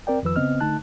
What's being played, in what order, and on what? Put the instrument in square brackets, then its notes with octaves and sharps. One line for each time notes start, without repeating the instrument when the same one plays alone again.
[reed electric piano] C4 A#4 D5 G5
F2 D#3 F3 B4 E6
C#3 B3 C4 D#5 F6
D3 A3 D#4 A5 F#6